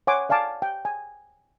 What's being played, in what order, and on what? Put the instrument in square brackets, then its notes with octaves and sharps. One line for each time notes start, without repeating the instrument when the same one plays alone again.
[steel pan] C#5 F#5 G#5 C6 D6
D5 F5 G#5 A5 D6
G5
G#5